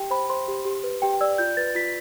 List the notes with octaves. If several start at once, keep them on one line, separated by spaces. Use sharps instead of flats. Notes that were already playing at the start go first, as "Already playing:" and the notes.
Already playing: G4 G5
C5 B5
C5 C6
G4
G4
B4
G4 G5
D5 E6
F4 G6
B4 A6
F4 B6